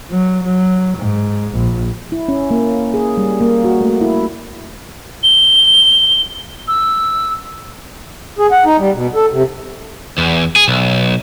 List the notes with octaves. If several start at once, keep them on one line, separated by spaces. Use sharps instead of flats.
F#3
F#3
G#2
A#1
E4
C#4
A#3
G#4
G3
A#3
F#4
A3
E4
G7
E6
G#4
F#5
D#4
G3
B2
A4
C3
E2
G#4
B1